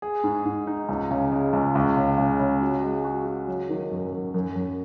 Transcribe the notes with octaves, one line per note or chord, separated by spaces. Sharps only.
G#4
G#2
G#2
D#4
C#2
C#3
G#3
C#2
C#2
C#3
C#3
C#3
F#4
G#3
F#4
F#4
F#3
D#3
F#2
F#2
F#2
F#2